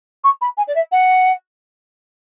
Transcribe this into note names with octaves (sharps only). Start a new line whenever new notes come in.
C#6
B5
G#5
D5
E5
F#5